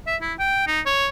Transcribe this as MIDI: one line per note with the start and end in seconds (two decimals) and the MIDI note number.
0.07 0.16 76
0.22 0.34 64
0.39 0.64 79
0.67 0.81 63
0.86 1.09 73